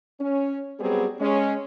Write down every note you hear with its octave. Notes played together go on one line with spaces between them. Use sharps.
C#4
F#3 G3 B3 C4 G#4
G#3 C#4